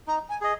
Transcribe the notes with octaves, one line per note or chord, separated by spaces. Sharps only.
D#4 A#5
G#5
G#4 D#5